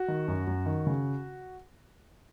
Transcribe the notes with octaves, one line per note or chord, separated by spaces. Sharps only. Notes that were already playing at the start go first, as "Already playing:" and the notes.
Already playing: F#4
D#3
F#2
F#2
D#3
C#3